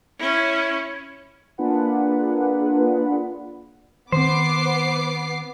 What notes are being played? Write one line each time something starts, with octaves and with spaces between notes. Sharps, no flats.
C#4 E4
A#3 D4 F4 G#4 B4 F#5
D#3 B3 C4 C5 D6 C7